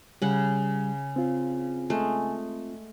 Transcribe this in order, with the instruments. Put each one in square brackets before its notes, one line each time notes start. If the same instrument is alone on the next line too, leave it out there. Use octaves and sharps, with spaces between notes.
[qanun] C#3 F#5 [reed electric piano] G3
[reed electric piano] C4 F4
[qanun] G#3 A3